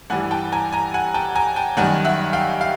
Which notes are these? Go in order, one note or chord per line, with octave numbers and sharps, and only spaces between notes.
G2 E3 G3 F#5 G#5
G5 A5
G#5 A#5
G#5 A#5
F#5 G#5
G5 A5
G#5 A#5
G5 A5
F#2 D#3 G3 F#5 G#5
E5 F#5
F5 G5
F5